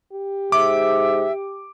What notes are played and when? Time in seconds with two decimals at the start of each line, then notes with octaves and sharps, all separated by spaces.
0.12 G4
0.52 G#2 E5 D6